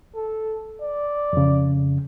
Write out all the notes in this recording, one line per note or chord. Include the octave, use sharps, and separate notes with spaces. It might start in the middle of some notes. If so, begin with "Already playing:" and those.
A4
D5
F2 C#3